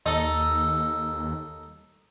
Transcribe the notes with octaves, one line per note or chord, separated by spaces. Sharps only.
D#2 D#4 A4